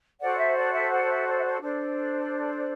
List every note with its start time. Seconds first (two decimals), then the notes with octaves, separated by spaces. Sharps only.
0.20 F#4 A4 C5 D5 F#5
0.38 E5
0.56 D5
0.73 E5
0.91 D5 F#5
1.08 E5
1.26 D5
1.38 E5
1.43 D5
1.61 D4 A4 C5 D5